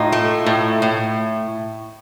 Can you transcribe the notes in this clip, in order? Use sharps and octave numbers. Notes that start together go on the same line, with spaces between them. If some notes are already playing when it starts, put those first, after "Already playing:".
Already playing: A2 D#4 F4
A3
A2
A2